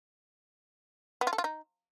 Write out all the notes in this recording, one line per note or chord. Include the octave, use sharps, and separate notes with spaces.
B3
F4
A4
F4
D#4